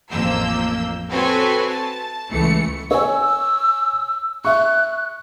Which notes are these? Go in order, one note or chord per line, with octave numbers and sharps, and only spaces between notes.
A1 F2 F3 A#3 E6 G6
C4 F#4 A4 B4 C#5 G#5
A5
C#2 E3 A3 C#7
C#5 G#5 E6
E5 C#6 F#6